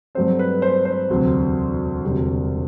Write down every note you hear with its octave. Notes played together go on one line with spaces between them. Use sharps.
G2 F#3 A3 C4 C5
B4
C5
C5
E1 D2 C3 F#3 C4
E1 D2 C3 G3